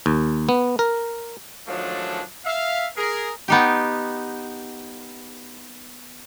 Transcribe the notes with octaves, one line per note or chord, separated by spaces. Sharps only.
D#2
B3
A#4
D#3 F3 F#3 G#3 A3 D4
E5 F5
G#4 A#4
B3 D#4 G4